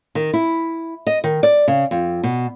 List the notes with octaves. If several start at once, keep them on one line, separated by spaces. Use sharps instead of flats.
D#3
E4
D#5
D#3
D5
C#3
F2
B2